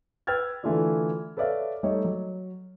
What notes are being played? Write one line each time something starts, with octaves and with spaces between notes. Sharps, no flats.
B4 G5 E6 F6 G#6 A6
D3 E3 A3 F4 F#4 D5
A4 B4 C#5 D5 E5 F5
G3 A3 D#4 C#5 D#5
F#3